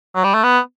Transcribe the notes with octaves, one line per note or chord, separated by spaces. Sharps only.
F#3
G3
A3
B3